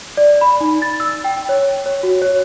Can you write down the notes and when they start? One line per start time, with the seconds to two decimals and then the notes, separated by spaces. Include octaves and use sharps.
0.17 D5
0.41 B5
0.61 D#4
0.82 A6
1.00 E6
1.24 G5
1.49 C#5
1.86 C#5
2.03 F#4
2.22 C#5